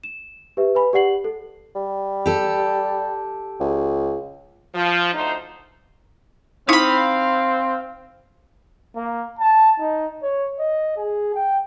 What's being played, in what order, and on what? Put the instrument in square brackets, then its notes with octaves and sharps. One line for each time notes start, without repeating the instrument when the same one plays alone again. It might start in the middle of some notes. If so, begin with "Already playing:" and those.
[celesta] E7
G4 B4 E5
B4 G#5 B5
G4 D5 F#5 C7 F#7
A4
[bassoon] G3
[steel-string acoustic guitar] G4 A4
[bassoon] C#2
[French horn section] F3
D2 D#4 C5
[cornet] C4 [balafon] D#4 E4 [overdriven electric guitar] F5 [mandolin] B5 D#6
[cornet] A#3
A5
D#4
C#5
D#5
G#4
G5